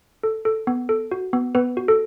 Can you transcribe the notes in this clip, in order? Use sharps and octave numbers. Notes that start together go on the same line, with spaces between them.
A4
A4
B3
A4
F#4
B3
B3 B4
F#4
A4